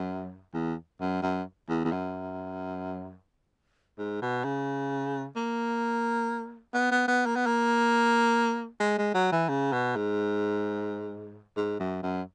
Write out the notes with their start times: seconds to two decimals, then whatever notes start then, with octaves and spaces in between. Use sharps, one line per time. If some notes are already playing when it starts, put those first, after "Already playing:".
Already playing: F#2
0.54 E2
1.01 F#2
1.22 F#2
1.69 E2
1.85 E2
1.92 F#2
3.98 G#2
4.22 B2
4.44 C#3
5.36 A#3
6.74 B3
6.91 B3
7.08 B3
7.26 A#3
7.36 B3
7.46 A#3
8.80 G#3
8.98 G#3
9.15 F#3
9.32 E3
9.49 C#3
9.73 B2
9.96 G#2
11.57 G#2
11.80 F#2
12.03 F#2